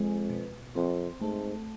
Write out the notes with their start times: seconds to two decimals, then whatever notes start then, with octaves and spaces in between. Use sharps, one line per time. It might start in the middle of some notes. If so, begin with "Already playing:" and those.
Already playing: F2 G#3
0.30 B2
0.76 F2 C4
1.21 G#2 A3